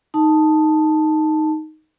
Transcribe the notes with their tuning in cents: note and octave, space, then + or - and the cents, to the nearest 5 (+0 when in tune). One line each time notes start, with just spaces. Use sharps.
D#4 +0 A5 +0